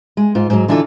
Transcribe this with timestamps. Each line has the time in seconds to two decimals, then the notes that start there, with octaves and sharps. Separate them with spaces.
0.17 G#3
0.35 G#2 F4
0.50 G#2 F#3
0.68 D3 E3 D4 D#4 F4 A4